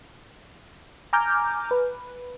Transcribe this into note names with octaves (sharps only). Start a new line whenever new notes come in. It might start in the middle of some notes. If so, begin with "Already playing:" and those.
G#5 A#5 D6 F6 G6
B4